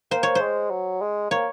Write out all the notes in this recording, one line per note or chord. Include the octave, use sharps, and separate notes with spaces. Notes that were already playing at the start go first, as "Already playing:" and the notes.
A#3 C5
C#5
G#3 C5
F#3
G#3
A#3 C#5